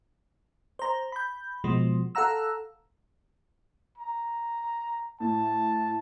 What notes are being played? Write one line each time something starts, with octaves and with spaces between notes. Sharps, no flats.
C5 A#5
B5 G6
B2 F3 G#3
A4 F5 F#5 A#5 E6
A#5
A2 A5